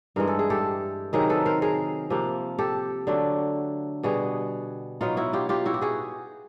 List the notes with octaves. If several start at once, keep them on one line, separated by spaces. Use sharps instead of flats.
G2 E3 G#3 A#4
A4
G#4
G4 A4
C3 D#3 F#3 G#4 A#4
A4 B4
A#4 C5
G#4 A#4
C3 F3 A#3
G4 A4
D3 F#3 A3 D4
B2 G3 B3 F#4 G#4
B2 F#3 B3 D#4 F4
E4 F#4
F4 G4
F4 G4
E4 F#4
G4
F#4 G#4